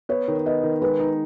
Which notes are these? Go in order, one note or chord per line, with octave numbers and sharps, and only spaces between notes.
B3 C#5
D#3
B3 D#5
D#3
G#3 B4
D#4